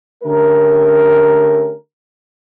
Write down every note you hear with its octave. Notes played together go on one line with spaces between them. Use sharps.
D3 A3 C#4 G4 A#4